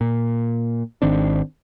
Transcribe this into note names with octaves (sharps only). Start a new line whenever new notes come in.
A#2
G#1 D#3 C4 D4